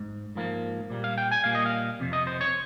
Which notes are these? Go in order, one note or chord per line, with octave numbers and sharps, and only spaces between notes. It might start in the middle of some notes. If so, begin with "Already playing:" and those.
Already playing: G#2
G#2 F3 A#3
A#2 G3 A#3
F5
G5
G#5
A#2 G3 A#3 F5
D#5
F5
F2 C3
D#5
C5
C#5